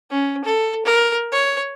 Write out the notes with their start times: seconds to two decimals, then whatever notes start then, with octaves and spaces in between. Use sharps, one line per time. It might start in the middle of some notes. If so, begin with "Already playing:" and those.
0.11 C#4
0.44 A4
0.86 A#4
1.32 C#5